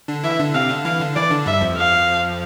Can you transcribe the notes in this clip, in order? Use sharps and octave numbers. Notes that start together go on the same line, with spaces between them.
D3 D4
E3 E4 E5
D3 D4
C3 C4 F5
D3 D4
E3 E4 F5
D3 D4
E3 E4 D5
D3 D4
G2 G3 E5
F2 F3
F5